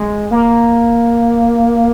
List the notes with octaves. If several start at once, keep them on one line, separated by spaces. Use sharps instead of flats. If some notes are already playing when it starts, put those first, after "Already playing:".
Already playing: G#3
A#3